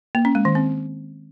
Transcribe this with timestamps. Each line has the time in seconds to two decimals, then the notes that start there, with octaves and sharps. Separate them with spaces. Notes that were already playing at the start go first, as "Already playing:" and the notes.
0.15 A#3
0.25 C#4
0.35 G#3
0.45 D#3
0.55 C4